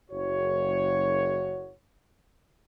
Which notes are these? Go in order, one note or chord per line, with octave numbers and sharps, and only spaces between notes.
F#1 F#4 C#5